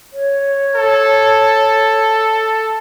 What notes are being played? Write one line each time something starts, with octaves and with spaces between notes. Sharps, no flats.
C#5
A4